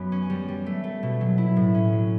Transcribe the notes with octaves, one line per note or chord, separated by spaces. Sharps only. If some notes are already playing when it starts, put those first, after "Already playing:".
Already playing: F#2 B3
C#4
G3
G3
A3
A3
B2
F#3
E4
A2
C#4
F#3